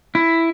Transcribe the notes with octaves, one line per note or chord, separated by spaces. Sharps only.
E4